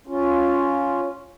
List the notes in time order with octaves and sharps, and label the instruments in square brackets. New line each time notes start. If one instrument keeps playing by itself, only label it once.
[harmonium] C#4 F4